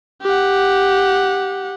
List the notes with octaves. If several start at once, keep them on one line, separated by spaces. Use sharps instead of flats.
G4 F#5